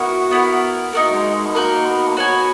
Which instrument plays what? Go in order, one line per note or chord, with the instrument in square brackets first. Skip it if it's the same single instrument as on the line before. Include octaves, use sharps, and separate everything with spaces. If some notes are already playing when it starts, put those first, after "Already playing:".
Already playing: [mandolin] B3 E4 A#4 [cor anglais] F#4
[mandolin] B3 E4 A#4
[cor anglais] A#3 [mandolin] D#4 F#4 A#4
[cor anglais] F#3
G#3
G#3
B3
[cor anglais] A#3 [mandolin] D#4 F#4 A#4
[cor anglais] B3
A#3
[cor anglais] B3 [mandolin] F#4 C#5 G#5